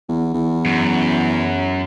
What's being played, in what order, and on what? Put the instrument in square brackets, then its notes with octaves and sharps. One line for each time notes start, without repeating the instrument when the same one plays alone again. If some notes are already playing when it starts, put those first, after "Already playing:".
[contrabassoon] E2
E2
[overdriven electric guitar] F#2